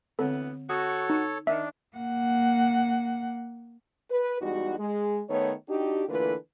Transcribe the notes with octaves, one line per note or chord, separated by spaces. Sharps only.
D2 D3 E3 G#3 B3 C4 A4
F#4 A4 C#5 D#6
D#4
D#3 D4 E5
A#3 F#5
B4
E2 G3 G#3 D#4 F#4
G#3
D#3 A3 B3 C#5
D4 D#4 F#4 G4
D3 E3 A3 A#3 F4 B4